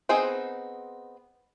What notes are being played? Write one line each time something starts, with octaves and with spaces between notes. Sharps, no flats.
B3 C4 D#4 G#4 C5